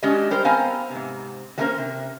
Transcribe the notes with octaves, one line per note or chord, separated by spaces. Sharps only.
G#3 C#4 D4 F#4 G4 D#5
G3 G4 A#4 C5
B3 C4 C5 F5 G#5 A#5
G#2 C3
F#3 A3 A#3 C#4 A#4 C5
C3